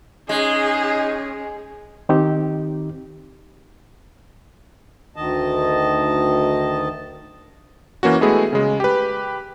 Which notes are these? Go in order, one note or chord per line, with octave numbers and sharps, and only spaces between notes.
G#3 C#4 D#4 G#4
D#3 C4 D#4 G4
D2 D#3 D#5 A5
E3 A#3 C#4 F#4
G#3 A3 B3 E4 F#4 G#4
C#3 G#3
G4 B4